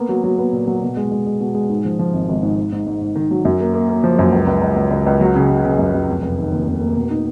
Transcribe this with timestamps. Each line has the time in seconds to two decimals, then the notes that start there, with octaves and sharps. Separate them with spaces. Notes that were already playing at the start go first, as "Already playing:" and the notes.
Already playing: A#3 B3
0.09 F#3
0.24 F#3
0.38 B3
0.53 A#2
0.67 F#3
0.83 B2
0.97 G#3
1.12 G#3
1.26 G#3
1.41 B2
1.55 G#3
1.69 G#2
1.85 F3
1.99 F3
2.13 G#1
2.29 G#1
2.43 G#2
2.57 G#2
2.72 G#2
2.86 G#2
3.01 G#2
3.16 D#3
3.31 F#3
3.45 F#2
3.60 A#3
3.74 A#3
3.89 A#3
4.04 F3
4.19 F#2
4.32 C#2
4.47 C#2
4.62 C#2
4.76 C#2
4.91 C#2
5.06 C#2
5.21 F#3
5.36 C#3
5.49 F#3
5.65 C#3
5.79 F#2
5.94 F#2
6.08 F1
6.22 F1
6.38 D#3
6.52 D#2
6.67 F1
6.81 A#3
6.96 B2
7.10 D#4